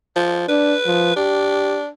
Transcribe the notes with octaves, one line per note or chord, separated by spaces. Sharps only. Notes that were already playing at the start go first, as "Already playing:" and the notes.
F3
D4 B4
F3
D4 G4